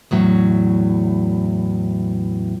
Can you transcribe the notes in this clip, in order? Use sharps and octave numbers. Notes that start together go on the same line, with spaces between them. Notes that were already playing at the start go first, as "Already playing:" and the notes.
E2 A2 F#3